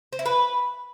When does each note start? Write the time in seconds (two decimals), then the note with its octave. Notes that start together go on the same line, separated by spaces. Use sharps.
0.13 C5
0.19 E4
0.26 B4